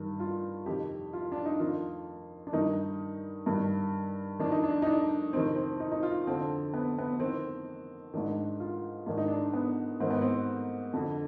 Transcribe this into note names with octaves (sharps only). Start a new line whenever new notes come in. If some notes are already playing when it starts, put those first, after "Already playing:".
Already playing: G2 D#3
F4
F2 C3 D#3 G4
F4
D4
D#4
F2 D#3 F4
D4
G2 D#3 D#4
G2 D#3
F2 D#3 D4
D#4
D4
D#4
D4
F2 C3 D#3 C4
C4
D#4
D#4
F4
F2 D3 C4
B3
B3
F2 D#3 C4
G#2 D#3 D4
F4
G#2 D#3 D4
D#4
D4
B3
G#2 D#3 C4
B3
C4
F2 D3